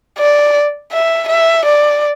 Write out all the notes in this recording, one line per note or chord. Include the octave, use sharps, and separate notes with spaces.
D5
E5
E5
D5